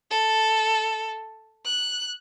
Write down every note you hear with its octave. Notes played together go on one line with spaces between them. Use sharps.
A4
F#6